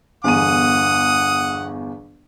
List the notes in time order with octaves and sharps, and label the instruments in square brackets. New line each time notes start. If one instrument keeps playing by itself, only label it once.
[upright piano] G1 E2 D#7 [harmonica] F#5 D#6